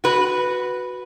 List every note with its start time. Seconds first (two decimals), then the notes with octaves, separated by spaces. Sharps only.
0.04 F#4 B4